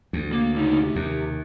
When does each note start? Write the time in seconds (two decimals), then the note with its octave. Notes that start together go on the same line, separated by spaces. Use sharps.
0.13 D2
0.32 A#3
0.56 C#2 D#4
0.81 C3
0.96 D#2